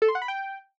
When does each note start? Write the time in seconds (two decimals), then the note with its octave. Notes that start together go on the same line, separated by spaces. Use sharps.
0.02 A4
0.08 C6
0.15 F#5
0.22 B5
0.28 G5